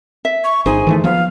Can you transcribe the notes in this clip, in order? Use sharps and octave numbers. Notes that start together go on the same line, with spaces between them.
E5
C#6
G1 D#4 G#4 C5 G#5
D#3 E3 A3
F3 F#3 B3 F5